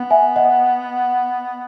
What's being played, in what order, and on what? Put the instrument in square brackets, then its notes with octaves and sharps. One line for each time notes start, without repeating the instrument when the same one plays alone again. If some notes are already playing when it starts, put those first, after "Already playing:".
Already playing: [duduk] B3
[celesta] E5 G#5
D#5 F#5